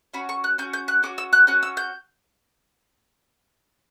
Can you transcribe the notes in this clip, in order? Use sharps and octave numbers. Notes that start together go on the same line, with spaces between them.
C#4 F#4 B5
C#6
F#6
C#4 F#4 G6
G6
F#6
C#4 F#4 D6
E6
F#6
C#4 F#4 F#6
E6
G6